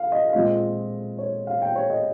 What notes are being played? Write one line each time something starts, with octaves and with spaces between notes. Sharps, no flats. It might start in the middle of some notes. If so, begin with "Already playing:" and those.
Already playing: F5
D#5
F5
A#2 G#3 C4 F4 D#5
C#5
F5
G5
C#5
D#5